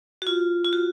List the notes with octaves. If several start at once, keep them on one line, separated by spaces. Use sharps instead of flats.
F#4
F4
F4
F#4